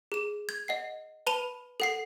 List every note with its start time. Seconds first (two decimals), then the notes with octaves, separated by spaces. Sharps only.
0.12 G#4 E7
0.49 G#6
0.68 D#5 F#5 C7
1.27 B4 A5 B5 D#7 F7
1.80 A4 F#5 C7